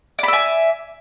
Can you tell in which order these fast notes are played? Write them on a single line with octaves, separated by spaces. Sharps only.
D5 B5 E5 G#5